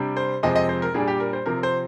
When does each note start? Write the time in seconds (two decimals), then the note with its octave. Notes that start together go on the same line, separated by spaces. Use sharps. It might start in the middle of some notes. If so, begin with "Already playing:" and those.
Already playing: C3 G3 D4
0.17 C5
0.43 F2 C3 F3 G#3 C4 D#5
0.56 D#5
0.69 C5
0.82 A#4
0.94 A#2 G3 D4 G#4
1.08 G4
1.20 A#4
1.33 C5
1.46 C3 F3 C4 A#4
1.63 C5